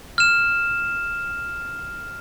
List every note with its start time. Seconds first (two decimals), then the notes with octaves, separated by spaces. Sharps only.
0.18 F6 E7